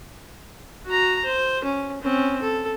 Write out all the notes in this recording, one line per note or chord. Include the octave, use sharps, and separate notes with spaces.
F#4 A#5
C5
C#4
C4 C#4
A4